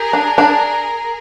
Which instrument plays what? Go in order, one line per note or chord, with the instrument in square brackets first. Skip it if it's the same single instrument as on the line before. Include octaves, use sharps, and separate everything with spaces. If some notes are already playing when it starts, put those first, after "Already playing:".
Already playing: [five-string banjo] G4 [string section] G#4 A#4
[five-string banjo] D4
D4